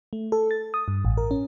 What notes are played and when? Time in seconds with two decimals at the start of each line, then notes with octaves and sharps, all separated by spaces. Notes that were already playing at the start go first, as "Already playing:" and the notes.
0.13 A3
0.32 A4
0.51 A6
0.74 D#6
0.88 G2
1.05 A1
1.18 A#4
1.31 C#4